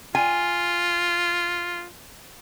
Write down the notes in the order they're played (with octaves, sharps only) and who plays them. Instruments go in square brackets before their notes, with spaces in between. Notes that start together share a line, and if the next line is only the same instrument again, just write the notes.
[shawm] F4 [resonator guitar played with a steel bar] G#5